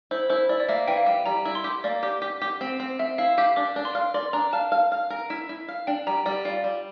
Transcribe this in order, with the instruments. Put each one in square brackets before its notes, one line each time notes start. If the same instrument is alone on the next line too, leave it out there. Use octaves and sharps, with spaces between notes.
[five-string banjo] E4 [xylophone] C5
[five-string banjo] E4 [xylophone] C5
[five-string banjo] E4 [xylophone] D5
[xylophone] D5
[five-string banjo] A#3 [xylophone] E5
[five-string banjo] E3 [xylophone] G5
[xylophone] F5
[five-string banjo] G3
[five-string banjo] G3 [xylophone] A#5
[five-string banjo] E4
[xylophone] C6
[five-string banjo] G4
[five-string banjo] A#3 [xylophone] D5
[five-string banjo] G4
G4
G4
C4
C4
[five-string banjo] C4 [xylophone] E5
[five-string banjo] E4 [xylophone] F5
[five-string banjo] G4 [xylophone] F5
[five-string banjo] D4 [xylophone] D6
[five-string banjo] D4
[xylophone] C6
[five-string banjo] F5
[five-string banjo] D5 [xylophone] C6
[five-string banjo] D4 [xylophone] A#5
[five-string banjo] F5 [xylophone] A5
[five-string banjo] F5
F5
A#4
E4
E4
F5
[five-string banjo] D4 [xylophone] G5
[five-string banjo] G3 [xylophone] A#5
[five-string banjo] G3 [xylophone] D5
[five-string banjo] F4 [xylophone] D5
[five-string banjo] G3